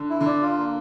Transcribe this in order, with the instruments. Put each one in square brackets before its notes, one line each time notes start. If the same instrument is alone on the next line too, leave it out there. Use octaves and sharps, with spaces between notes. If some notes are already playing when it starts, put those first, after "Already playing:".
Already playing: [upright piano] D3
[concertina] E4
[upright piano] D3 [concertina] D5
[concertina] F4
A#3